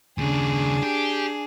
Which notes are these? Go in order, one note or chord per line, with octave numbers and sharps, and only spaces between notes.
D#2 C#3 D4 G#4
G4